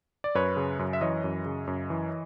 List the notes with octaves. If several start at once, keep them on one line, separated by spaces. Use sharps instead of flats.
D5
F#2 B4 C#5
C#3
F#2
E5
E3 C#5 D#5
F#2
C#3
F#2
E3